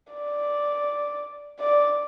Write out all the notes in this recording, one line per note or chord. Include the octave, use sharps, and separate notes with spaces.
D5
D5